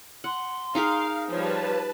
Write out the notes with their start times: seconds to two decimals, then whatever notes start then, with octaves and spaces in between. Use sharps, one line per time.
0.24 F#5 C6
0.75 D#4 G#4 A#4 F5
1.30 F3 G3 B4 C#5 A5